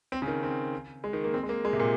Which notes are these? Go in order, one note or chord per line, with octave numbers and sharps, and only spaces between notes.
C4
C#3
D#3
C4
G#3
D#3
A#3
C4
G#3
A#3
G#3
C3
A#2